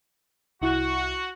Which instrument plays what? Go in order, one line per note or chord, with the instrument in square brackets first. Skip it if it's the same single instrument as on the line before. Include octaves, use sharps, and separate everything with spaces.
[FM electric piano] C2 E4 [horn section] F#4